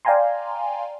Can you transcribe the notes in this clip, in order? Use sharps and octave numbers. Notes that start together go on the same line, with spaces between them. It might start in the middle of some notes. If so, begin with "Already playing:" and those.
D5 F5 G5 G#5 A#5 C6